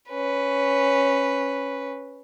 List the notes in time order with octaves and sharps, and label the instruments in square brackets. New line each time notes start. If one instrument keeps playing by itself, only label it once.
[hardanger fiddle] C#4 B4